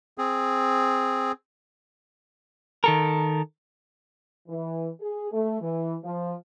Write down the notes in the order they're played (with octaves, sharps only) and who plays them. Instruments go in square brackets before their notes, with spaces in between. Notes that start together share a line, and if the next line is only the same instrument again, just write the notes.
[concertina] C4 G#4
[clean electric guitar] D#3 A4 A#4
[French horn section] E3
G#4
A3
E3
F3